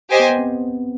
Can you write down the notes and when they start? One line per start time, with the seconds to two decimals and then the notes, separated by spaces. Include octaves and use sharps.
0.10 G4 C5 D#5 G#5
0.20 B3
0.30 B3
0.39 C4